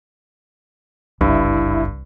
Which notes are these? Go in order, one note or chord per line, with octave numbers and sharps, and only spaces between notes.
F#1 C2 G2 E4